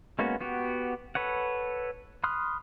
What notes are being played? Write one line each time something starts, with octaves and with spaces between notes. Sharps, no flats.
G#3 A#3 B3 C#4 F#4
B3 F#4 G4
A4 B4 C#5 F#5
B5 C6 D#6 F6 F#6